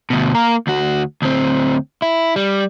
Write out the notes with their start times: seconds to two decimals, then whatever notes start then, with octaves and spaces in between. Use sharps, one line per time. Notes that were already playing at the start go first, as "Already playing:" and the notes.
0.10 D2 B2
0.35 A#3 A#4
0.67 D2 F#4
1.22 D2 C4
2.02 E4
2.36 G3